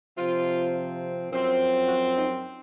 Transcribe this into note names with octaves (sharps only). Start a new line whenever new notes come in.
C3 F3 C4 F4
F#2 F3 C4
F#4
D#4